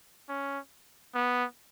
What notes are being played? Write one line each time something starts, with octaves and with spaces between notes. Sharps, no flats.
C#4
B3